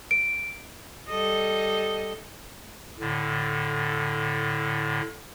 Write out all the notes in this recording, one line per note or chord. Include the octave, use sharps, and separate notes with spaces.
D7
G3 A4 D#5
A2 D3